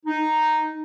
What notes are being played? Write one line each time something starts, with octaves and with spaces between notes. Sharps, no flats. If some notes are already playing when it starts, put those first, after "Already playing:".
D#4